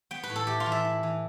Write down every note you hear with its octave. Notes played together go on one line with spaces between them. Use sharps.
B3 G5
B4
A2
A4
E4 G4
F4
E3
E5
E4
E3